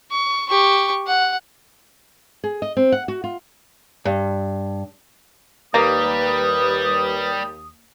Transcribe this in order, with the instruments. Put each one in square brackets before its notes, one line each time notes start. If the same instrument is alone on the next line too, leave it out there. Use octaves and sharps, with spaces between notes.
[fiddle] C#6
G4 C#6
F#5
[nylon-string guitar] G#4
D#5
C4
F#5
F#4
F4
[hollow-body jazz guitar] G2
[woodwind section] D#2 D#6 [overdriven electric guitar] G3 [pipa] A#3 [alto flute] B4